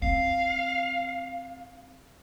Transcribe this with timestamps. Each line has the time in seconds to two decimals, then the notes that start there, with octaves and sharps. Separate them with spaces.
0.02 C4 F5